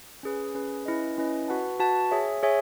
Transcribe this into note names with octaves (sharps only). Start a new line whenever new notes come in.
C#4 G#4 B4
C#4 G#4 B4
C#4 E4 B4 D#5
C#4 E4 B4 D#5
F#4 B4 F#5 A5
F#4 B4 F#5 A5
G#4 C#5 E5 G#5
G#4 C#5 E5 G#5